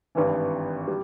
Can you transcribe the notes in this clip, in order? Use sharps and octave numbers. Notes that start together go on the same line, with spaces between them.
G#1 G2 E3
G3